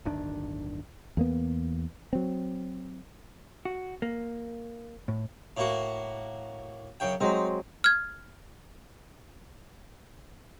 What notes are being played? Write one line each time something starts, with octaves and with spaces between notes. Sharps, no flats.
D1 G1 D#3 D4
E2 A#3 B3
F#3 C4
F#4
A#3
A2
A2 A#3 F#4
F#2 C#3 G5
F#3 G#3 C4 D#4
F6 G#6